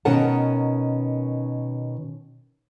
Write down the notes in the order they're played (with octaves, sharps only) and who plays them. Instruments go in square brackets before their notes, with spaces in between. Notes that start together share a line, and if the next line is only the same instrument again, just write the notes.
[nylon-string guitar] B2 D#3 C#4 A#4 F#5 A5